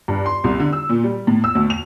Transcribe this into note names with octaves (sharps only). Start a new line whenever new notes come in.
G2
C6
C2
D3
E6
A#2
G3
A2
E6
D2
F7